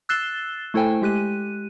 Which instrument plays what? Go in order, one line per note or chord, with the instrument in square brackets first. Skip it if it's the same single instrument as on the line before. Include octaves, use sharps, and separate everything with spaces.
[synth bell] E6 F#6 A6 C7 E7 G7
A3 E4 A4 C5 G5 G#5
G#3 G4 F#6 D#7